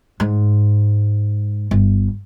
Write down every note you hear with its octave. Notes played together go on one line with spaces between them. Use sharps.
G#2
G1